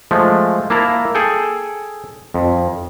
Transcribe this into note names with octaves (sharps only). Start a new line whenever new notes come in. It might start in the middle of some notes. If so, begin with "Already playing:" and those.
F3 G#3 A3
A#3 E4 A5 A#5
G#4 A4 G5
F2